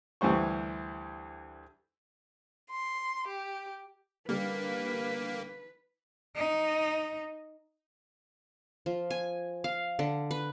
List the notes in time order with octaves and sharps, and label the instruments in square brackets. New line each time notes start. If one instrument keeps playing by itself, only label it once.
[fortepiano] D2 E3 G3 C5 C#6
[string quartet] C6
G4
[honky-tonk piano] D3 G3 [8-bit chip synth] A#3 [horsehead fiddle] B4
[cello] D#4
[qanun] F3
G#5
F5
D3
B4